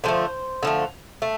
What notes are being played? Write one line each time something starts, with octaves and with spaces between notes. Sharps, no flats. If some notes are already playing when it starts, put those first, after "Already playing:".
D3 F3 A3 C5
D3 F3 A3
A3